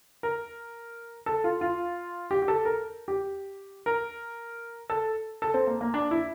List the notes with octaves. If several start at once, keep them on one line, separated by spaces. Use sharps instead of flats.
A#4
A4
F4
F4
G4
G4
A4
A#4
G4
A#4
A4
A4
C4
A#3
A#3
D4
E4